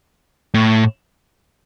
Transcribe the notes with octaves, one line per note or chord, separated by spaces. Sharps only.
A2